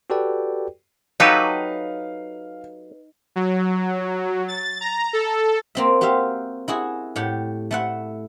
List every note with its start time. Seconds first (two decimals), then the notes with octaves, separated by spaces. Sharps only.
0.10 F#4 G4 A4 B4 D5 G5
1.20 F#3 D#4 G4 A4 B4 F5
3.36 F#3
4.48 A6
4.81 A#5
5.13 A4
5.75 A#3 C4 E5
6.01 F#4 G4 C5 E5 F5
6.68 E4 F#4 G#4
7.16 A2 G4 F#5
7.71 A3 E4 F#5